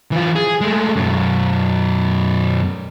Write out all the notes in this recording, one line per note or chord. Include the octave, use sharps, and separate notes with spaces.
E3 F4
G#4
G#3 A3
F#2 B2